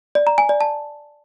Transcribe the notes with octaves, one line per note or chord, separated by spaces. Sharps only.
D5
A#5
G#5
D5
A5